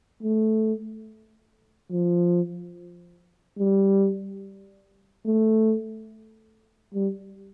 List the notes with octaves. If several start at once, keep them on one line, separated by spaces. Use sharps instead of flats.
A3
F3
G3
A3
G3